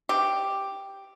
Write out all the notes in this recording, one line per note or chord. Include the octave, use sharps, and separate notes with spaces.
G4